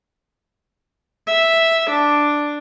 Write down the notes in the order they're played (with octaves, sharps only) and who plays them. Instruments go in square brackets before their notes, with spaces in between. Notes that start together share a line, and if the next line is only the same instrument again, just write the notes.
[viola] E5
D4